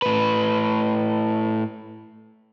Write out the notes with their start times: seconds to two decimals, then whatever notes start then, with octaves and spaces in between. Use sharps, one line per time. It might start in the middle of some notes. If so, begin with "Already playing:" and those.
0.02 A2 B4